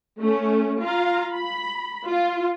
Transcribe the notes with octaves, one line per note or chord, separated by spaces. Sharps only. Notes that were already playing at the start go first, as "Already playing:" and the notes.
A3 C#4
F4 F5 A#5
B5
F4